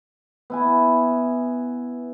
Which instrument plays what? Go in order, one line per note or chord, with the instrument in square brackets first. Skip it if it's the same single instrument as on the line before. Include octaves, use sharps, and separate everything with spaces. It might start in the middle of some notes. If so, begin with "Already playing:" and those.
[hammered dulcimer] B3 E4 G#5